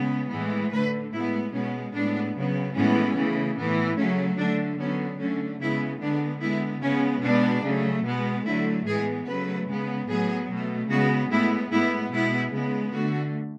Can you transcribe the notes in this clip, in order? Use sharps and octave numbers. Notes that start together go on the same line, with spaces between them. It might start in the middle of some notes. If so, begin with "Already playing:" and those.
Already playing: C#3 G#3 B3
A2 E3 G#3 B3
D3 A3 B4
A2 G#3 B3 E4
B2 G#3 B3 C#4
A2 G#3 B3 D4
C#3 F#3 B3
A2 E3 G#3 B3 C#4
C#3 E3 A3
A2 E3 B3
C#3 F#3 A3 C#4
D3 A3 D4
D3 F#3 B3 C#4
D3 A3 C#4
C#3 G#3 B3 E4
D3 G#3 B3 D4
D3 G#3 B3 E4
C#3 G#3 B3 C#4
B2 G#3 B3 D4
C#3 F#3 A3
B2 G#3 B3
D3 F#3 A3 E4
A2 E3 G#3 B3 G#4
C#3 F#3 A3 B4
C#3 G#3 B3
A2 F#3 B3 G#4
B2 A3
C#3 G#3 B3 F#4
A2 G#3 B3 E4
A2 G#3 B3 E4
B2 G#3 B3 E4
C#3 G#3 B3
D3 A3 F#4